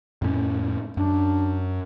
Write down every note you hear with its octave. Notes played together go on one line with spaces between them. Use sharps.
F2 A2 C#4
F#2 D4